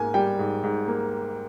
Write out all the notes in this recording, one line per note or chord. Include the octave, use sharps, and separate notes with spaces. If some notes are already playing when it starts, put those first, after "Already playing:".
Already playing: G#2 A#3 G#5
G3 G5
G#2
G#2
A#3